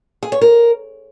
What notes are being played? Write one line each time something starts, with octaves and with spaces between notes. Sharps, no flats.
G#4
C#5
A#4